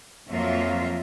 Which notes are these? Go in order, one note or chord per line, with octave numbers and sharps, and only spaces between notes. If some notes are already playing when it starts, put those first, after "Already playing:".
F2 F3 F#3 A#3 F4 E5